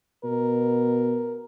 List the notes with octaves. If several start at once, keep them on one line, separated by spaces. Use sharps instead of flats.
B2 A#4